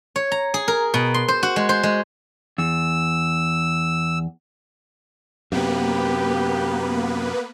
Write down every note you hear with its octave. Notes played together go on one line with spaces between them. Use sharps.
C#5
A#5
G#4
A#4
B2
C6
C5
F#4
G#3
C5
G#3
E2 E6
F#2 C3 A#3 B3 G4 B4